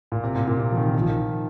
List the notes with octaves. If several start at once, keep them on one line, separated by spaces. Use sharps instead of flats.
A#2
C3
A#2
A#2
C3
F3
D#3
D#3
F3
D#3